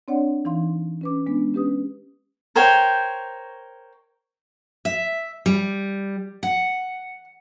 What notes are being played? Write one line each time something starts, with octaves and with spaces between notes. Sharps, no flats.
C4 D4 C#5 D5 F#5
E3 D#4 F5 C6
C#4 B4 D6
G#3 B3 D4
C#4 G4 B4 D#6
A#4 C5 C#5 G5
E5
G3
F#5